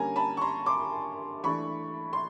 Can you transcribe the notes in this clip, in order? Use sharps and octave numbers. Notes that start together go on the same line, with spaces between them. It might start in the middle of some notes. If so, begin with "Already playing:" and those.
Already playing: D3 G3 A#3 C#4 G#5 A#5
A5 B5
C#6
A#5 C6
C6 D6
E3 A3 D4 B5 C#6
C6